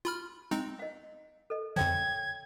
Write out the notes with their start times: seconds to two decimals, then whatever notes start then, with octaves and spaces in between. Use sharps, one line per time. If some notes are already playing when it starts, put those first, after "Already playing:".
0.05 F4 B5 F6
0.51 G#3 C4 D#4
0.79 D#5 F5
1.50 A4 D#5
1.76 F2 D3 F3 C#5 G5 G#6